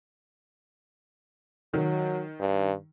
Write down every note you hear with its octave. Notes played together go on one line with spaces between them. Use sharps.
D#3 F#3
G2